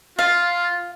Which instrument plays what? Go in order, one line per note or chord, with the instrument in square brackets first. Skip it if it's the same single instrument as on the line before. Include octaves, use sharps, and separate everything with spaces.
[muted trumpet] F4 [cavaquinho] F5